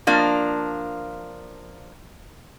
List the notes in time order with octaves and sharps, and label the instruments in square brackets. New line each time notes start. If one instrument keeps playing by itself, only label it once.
[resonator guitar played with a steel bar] F3 A#3 D4